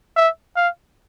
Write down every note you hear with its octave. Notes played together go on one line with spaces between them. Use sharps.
E5
F5